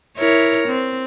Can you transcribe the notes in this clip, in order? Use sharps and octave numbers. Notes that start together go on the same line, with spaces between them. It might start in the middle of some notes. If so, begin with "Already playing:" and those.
E4 A#4 C#5
C4